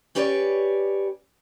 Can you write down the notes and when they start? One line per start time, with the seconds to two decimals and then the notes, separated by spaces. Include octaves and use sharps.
0.15 C#4 G4 B4 C#5 D5